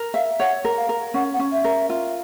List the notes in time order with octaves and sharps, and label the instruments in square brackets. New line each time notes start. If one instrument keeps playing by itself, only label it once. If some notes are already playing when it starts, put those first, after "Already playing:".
Already playing: [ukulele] A#4
[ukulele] E5 [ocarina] F5
[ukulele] C#5 [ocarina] F#5
[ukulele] A#4
[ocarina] F5
[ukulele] A#4
[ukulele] C#4 [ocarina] F#5
[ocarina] F#5
[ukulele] C#4
[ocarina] E5
[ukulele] A#4
F4